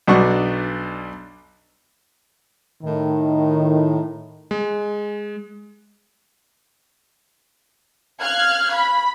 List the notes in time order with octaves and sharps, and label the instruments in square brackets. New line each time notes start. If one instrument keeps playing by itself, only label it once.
[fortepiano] B1 B2 D4 F#5 C#6
[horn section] A2 D#3
[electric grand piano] G#3
[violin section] F5 F6 F#6 G#6
B5